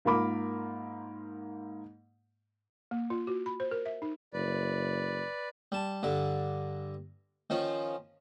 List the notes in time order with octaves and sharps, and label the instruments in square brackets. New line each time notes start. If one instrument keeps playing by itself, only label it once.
[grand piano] G#2 A#3 F4 A#4 B5 D6
[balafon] A#3
F4
F#4
B5
C5
A#4
E5
D#4
[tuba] F#1 [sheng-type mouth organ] B4 D5
[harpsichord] G3 A5
G2 D3 D5
D#3 F3 C#4 F4